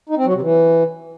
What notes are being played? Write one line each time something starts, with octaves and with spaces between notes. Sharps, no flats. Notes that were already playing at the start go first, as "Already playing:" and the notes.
D#4
C4
F#3
C3
E3